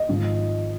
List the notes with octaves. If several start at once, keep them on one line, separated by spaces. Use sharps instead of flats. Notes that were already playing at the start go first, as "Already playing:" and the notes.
Already playing: D#5
G#1 G#2 F3